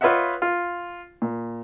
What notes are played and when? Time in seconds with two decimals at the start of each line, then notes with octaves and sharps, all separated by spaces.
0.01 F4 B4 C#5 D#5 E5 F#5
0.42 F4
1.22 A#2